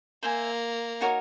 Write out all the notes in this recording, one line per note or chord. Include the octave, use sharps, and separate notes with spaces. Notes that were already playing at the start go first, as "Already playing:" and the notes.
A#3 C5 E5 G#5
D#4 F#4 A#4 C#5